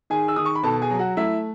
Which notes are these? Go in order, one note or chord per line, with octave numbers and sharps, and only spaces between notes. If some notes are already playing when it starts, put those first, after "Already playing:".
D#3 G#4 G#5
E6
D#3 D#6
C#6
B5
B2 A4 A5
G#4 G#5
F#3
F#4 F#5
A3 E4 E5